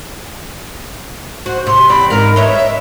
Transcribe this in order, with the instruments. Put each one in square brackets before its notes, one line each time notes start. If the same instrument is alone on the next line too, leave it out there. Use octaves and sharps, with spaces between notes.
[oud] F#4 [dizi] C5
[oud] C3 [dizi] C6
[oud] E2 C4 D5 [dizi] B5
[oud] G#2 F5 [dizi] A#4
[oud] B4 C#5 D#5 [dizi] E5